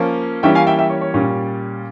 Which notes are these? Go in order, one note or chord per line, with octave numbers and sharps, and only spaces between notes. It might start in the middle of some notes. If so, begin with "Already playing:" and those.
Already playing: F3 A#3 C#4
E3 G3 A#3 C#4 E5 G5
F5 G#5
E5 G5
E5 G5
C#5
C#5
A#2 G3 C#4